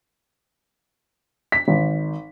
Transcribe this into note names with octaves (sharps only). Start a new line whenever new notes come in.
B6
G#1